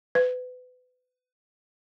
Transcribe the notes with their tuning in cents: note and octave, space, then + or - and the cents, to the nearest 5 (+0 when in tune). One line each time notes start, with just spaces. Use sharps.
B4 +30